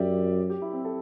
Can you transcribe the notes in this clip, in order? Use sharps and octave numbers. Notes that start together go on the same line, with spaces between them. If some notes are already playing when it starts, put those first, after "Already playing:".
Already playing: F#2 G4 D5 E5
G4
E4
C4
A4